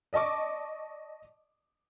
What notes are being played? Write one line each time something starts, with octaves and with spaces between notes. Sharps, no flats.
D5 D#5 A5 C#6 D6